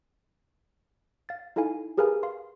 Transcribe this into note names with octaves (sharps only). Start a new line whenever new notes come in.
F5 A6
D#4 E4 A4 F5 G#5
G4 G#4 A#4 B4 F5 G#5
F5 C6